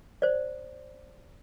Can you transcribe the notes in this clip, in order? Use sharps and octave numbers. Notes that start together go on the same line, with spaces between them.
C5 D5